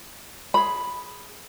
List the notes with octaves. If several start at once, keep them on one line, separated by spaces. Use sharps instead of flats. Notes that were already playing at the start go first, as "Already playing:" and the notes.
G#4 B5